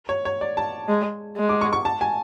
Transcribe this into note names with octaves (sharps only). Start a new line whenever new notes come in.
C#5
C#5
D5
A5
G#3
G#3
D6
C#6
C#6
A5
G#5